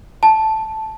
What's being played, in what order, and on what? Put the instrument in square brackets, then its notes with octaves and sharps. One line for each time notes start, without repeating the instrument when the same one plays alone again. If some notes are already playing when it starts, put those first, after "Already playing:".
[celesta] A5